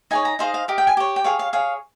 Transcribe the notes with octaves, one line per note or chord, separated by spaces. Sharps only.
D#4 G#4 C#5 G#5
A#5
D#4 G#4 C5 D#5 F5
F5
G4 A#4 D#5
G5
G#5
G4 C#5
G5
G#4 C#5 F5
F5
G#4 C#5 F5